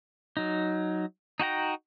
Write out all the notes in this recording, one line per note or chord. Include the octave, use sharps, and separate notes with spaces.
F#3 D#4
D#4 F#4 G5 A#5